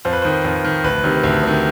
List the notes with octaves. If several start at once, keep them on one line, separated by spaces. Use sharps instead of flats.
F2 C5
B4
D#3 C5
F2
D#3
D2 B4
C3 D#3
D2
C3 D#3